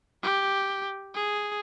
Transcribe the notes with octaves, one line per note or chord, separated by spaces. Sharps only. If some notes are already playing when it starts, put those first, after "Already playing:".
G4
G#4